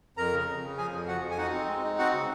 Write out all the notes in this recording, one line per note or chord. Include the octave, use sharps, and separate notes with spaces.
F2 A#4 A#5
C#3
C#3
C#3
F3 G#4 G#5
F2
F3 F#4 F#5
F2
G#5
D#4 F#4 F#5
C4
G#3
D#4
C4 F#4 F#5
C#3